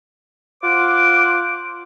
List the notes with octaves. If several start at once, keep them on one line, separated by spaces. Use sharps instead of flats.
F4 C5 F#5 D6